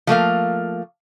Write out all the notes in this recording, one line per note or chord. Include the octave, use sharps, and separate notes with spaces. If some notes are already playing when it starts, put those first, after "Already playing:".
F3 A3 A#3 F5